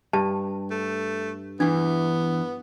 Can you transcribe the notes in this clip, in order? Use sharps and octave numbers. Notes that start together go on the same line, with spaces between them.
G2 A5
A3
E2 E3 B3 D4